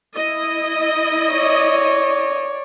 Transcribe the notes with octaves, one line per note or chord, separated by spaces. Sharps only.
E4 D#5
C#5 D5